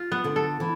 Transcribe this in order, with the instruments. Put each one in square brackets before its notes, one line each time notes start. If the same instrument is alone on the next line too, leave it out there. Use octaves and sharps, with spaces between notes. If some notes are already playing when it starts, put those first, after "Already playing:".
Already playing: [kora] F4
B3
[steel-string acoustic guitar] D3
[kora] A4
[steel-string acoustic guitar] E3